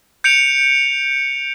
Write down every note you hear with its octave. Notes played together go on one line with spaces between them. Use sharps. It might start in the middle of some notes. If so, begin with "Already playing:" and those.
G6 C#7 D7 F7